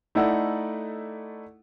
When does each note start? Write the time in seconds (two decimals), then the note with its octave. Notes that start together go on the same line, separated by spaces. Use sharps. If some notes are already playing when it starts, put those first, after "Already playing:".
0.15 A3 D#4 E4 A4 D5 F#5